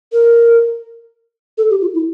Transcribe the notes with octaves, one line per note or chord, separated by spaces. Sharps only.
A#4
A4
G4
F4
E4